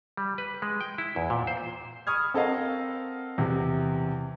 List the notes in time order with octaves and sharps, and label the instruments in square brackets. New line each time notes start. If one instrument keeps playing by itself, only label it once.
[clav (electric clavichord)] G3
B4
G#3
G5
E4
E2
A#2
C5
[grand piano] B5 C#6 D#6 F6 G#6
C4 A4 A#4 D#5 F5 F#5
E2 C3